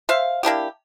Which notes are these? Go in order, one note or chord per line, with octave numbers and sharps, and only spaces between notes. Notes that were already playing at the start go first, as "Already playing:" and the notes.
C5 E5 F5
A#3 D4 E4 G4